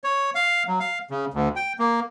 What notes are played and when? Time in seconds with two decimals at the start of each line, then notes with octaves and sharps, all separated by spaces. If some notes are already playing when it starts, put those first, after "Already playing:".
0.04 C#5
0.35 F5
0.67 F#3
0.80 F5
1.11 C#3
1.34 D2
1.56 G5
1.79 A#3